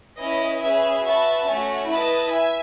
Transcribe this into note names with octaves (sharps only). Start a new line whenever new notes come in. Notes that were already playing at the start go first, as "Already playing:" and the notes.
C#4 E4 B4 D#5
C#4 G#4 B4 E5 G#5
F#4 B4 E5 A5
A3 C#4 F#4
E4 B4 D#5 A5
E5 G#5